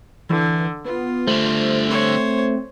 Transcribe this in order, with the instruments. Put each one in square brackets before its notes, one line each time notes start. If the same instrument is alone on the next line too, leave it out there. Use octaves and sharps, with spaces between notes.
[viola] D3 [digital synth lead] E3
[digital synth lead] B3 [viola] F4
[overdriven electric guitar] D3 G3 [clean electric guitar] A3 [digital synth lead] C5
[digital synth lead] C4 [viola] C5 C#5